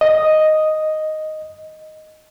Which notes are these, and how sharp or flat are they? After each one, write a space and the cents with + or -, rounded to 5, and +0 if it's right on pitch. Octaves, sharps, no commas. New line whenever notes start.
D#5 +0